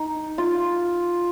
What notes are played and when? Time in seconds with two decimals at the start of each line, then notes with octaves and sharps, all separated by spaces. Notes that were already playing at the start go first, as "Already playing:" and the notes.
Already playing: D#4
0.38 F4